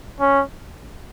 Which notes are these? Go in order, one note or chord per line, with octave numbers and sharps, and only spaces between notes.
C#4